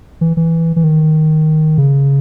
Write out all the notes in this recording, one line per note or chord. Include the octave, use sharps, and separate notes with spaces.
E3
E3
E3
D#3
C#3